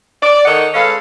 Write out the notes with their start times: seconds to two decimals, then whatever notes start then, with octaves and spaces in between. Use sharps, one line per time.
0.22 D5
0.46 D#3 D#4 A4 C#5 D#5 F#5
0.74 G#3 C#4 A4 B4 F5